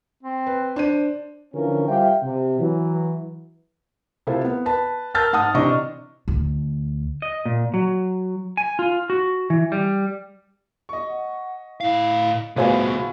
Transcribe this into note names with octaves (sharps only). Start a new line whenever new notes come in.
C4
B4
D4 C5 D#7
D3 E3 F3 C#4 F4 A#4
G3 F4 G4 C5 E5 G5
C3
E3 F#3
C3 E4 F4 A4 C5
B3
B4 A5
A#4 A5 E6 F6 G6 A6
G#2 F#5 A5 D#6 F6
C3 E3 D4 D#5 C#6
D2
D#5
A#2
F#3
G#5
F4
F#4
E3
G3
D#5 C#6
F#5
A2 E4 F5
C2 A2 B3 F4 F#4 G#4 B4 C5